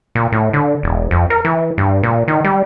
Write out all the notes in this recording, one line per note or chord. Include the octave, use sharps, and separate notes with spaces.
A#2
A2
D3
E1
F2
A#4
E3
G2
A#2
D#3
G3